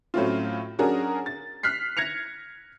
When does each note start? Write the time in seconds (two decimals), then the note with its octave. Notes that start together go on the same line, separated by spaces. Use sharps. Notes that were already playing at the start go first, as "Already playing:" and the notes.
0.14 A2 F#3 A3 C4 C#4 F4
0.79 F#3 C#4 D4 F#4 G#4 A#4
1.26 A6
1.63 F6 F#6 B6 C7
1.97 G#6 A#6 C#7 F7